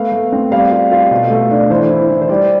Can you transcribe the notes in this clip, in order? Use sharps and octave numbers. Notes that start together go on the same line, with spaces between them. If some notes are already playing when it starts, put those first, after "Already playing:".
Already playing: A3 B3 F5
A3
C4
G3 F5
F4
F4
B2
A3
D4
E3 C5
E4
E3
C5
G3 D5